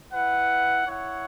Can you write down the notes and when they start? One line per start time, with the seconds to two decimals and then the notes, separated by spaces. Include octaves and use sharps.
0.12 E4 B4 F#5
0.85 E4 C#5 F#5